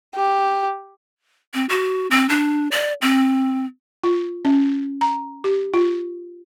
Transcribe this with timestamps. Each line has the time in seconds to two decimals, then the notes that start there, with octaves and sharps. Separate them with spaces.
0.15 G4
1.54 C4
1.69 F#4
2.11 C4
2.29 D4
2.71 D5
3.02 C4
4.04 F4
4.45 C#4
5.01 A#5
5.44 G4
5.74 F4